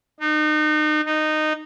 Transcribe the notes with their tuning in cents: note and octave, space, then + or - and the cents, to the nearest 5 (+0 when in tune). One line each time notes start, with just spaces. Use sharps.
D#4 -35
D#4 -15